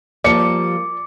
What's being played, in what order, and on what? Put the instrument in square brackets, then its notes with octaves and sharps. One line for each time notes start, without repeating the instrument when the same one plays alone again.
[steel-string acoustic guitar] F3 G3 A#3 [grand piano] D5 C#7 [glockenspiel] D6